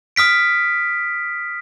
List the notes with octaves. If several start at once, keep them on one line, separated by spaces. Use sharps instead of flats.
D#6 F6 B6 D7